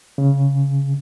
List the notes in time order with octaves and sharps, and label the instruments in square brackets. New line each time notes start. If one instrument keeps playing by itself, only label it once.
[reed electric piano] C#3